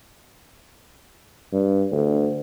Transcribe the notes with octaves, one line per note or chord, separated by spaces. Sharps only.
G2
D2